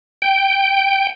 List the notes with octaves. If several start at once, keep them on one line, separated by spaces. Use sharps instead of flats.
G5